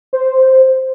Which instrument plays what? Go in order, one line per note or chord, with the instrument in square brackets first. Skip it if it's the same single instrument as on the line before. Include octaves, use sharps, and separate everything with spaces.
[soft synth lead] C5